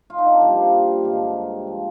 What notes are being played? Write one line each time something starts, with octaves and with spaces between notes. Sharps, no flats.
F4
D#4
D4
C4
A#2 F3 G3 A#3
G2 D3 F3 G#3
F3